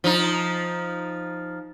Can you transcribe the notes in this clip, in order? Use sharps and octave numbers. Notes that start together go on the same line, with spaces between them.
F3 D#4